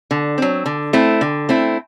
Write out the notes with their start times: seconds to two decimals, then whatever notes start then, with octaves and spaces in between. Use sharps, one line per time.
0.11 D3
0.38 F#3 C4
0.66 D3
0.93 A3 C4 E4
1.21 D3
1.49 A3 C4 E4